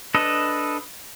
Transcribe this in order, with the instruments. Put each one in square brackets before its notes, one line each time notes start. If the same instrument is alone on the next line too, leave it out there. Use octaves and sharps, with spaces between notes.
[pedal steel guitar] D4 A4 B4 D#5